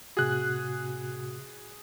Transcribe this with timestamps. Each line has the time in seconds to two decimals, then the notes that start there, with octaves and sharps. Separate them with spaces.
0.17 A2 C3 F#4 G#4 F#6